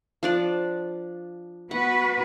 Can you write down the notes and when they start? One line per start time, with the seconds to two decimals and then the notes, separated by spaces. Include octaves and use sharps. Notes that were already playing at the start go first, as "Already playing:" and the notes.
0.23 F3 D4 D5
1.71 B3 F#4 B4 F#5